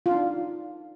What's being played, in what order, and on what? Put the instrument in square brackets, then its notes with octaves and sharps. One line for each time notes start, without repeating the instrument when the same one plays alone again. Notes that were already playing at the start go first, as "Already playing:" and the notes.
[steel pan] F4
D4
D#4